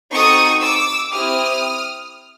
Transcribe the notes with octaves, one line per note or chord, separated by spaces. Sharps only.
C4 D#4 F#4 A4 C#6 D#6
D6 E6
C4 E4 G4 D#6 F6